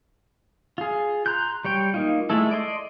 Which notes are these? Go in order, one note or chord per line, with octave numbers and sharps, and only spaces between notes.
F4 G#4
A#5 C6 F#6 G6
G3 C#5 G5
A#3 D#4 F4
G#3 A3 E4 A4
D5 D#5 C6